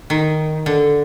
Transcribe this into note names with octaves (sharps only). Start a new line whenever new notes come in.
D#3
D3